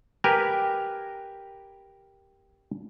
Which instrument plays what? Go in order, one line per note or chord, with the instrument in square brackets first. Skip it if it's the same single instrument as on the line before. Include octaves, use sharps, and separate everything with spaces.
[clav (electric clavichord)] G4 A#4 B4 G#5